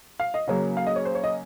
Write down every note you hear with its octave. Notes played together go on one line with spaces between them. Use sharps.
F5
D#5
C#3 F#3 A#3 C#4
F5
D#5
C#5
C5
C#5
D#5